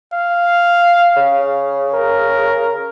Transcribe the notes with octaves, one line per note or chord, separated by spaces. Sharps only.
F5
C#3
A#4